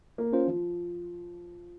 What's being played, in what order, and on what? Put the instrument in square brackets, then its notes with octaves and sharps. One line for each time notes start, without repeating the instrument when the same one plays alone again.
[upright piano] A#3
[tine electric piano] C#4 F4 C5
[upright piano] F3